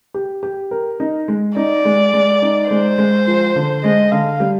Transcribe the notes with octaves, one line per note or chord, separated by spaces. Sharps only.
G4
G4
A#4
D#4
G#3
D#4 D5
G#3
G#3
D#4
G#3 C5
G#3
F3
D3
G#3 D#5
D3 F5
G3